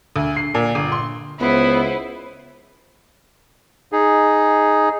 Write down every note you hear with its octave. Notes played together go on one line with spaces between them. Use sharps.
D2
C7
A#2
G1
C6
C#2 B3 E4 B4 C5
D#4 G#4